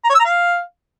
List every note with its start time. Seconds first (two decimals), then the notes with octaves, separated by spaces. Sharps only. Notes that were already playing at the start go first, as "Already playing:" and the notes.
0.04 A#5
0.09 C#5
0.14 E6
0.20 A#5
0.25 F5